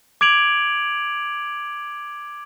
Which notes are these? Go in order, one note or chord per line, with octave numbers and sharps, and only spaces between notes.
D6 G#6 D7 F7 F#7